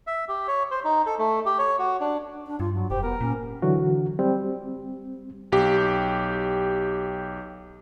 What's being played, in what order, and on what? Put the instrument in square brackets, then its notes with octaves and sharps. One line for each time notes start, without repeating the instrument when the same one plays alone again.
[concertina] E5
G4
C#5
C5
D#4
A4
A3
G4
C#5
F#4
D4
[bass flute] D4
[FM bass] G2 [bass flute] F4
[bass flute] F#3
[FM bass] F1 [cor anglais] G4 [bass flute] C5
[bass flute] B3 [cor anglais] A#4
[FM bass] A#2 [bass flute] C#4
[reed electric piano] D3 E3 F#3 F#4
G3 C4
[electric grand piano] B1 G4